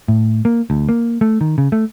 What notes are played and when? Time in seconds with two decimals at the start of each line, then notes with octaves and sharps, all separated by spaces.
0.08 A2
0.45 A#3
0.70 D2
0.89 A#3
1.21 A3
1.41 D#3
1.58 C#3
1.72 A3